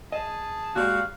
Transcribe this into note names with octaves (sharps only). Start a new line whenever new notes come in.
G#4 D#5 A5
A#2 G3 G#3 F#4 F5